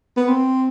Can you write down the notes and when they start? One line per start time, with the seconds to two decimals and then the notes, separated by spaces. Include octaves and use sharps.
0.17 B3
0.28 C4